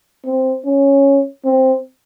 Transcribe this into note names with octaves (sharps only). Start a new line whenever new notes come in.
C4
C#4
C4